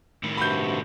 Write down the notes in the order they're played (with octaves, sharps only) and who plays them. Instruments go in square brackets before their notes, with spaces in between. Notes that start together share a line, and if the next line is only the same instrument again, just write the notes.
[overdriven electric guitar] A2 D#3
[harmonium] G2 C3 F#4 [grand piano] B5 G6